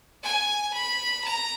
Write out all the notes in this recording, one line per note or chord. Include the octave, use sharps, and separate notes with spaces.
G#5
B5
A#5